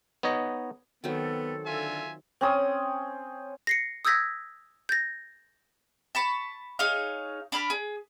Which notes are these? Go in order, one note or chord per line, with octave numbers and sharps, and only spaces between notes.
B3 D#4 C#5 D#5
D#3 F#3 B3 C4 A4
D3 F4 E5 G#5
C4 C#4 D#6
A#6 C7 C#7
D#6 E6 G6 G#6 A#6 B6
G6 A6 A#6
A5 B5 C#6
D#4 G#4 C#5 F5
D4 B5 F6
G#4